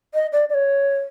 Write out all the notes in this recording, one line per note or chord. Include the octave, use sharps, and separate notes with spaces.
D#5
D5
D5
C#5